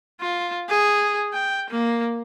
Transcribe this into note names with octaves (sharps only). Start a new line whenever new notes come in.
F4
G#4
G5
A#3